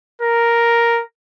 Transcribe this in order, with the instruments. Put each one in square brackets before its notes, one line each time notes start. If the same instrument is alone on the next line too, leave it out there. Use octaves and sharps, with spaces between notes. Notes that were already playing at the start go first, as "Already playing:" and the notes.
[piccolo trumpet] A#4